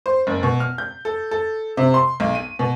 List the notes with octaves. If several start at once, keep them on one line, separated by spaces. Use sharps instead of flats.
C5
F#1
B2
F6
G6
A4
A4
C3
C6
B1
D#7
B2